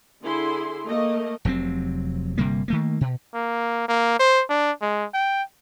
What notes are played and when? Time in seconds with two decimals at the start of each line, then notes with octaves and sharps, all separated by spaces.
0.22 D3 E4 G#4 C6
0.87 A3 A#3 D#5
1.45 F1 C3 F#3 C4
2.38 G1 C3 G3 A#3
2.68 D#3 A3 A#3
3.01 B2
3.35 A#3
3.88 A#3
4.19 C5
4.50 D4
4.82 G#3
5.14 G5